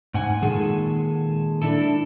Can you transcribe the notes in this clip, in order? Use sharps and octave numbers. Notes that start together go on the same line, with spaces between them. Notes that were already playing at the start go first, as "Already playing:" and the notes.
G#2 F#5 G#5
A#2 D#3 G#3 G#4 A4
D4 E4 A4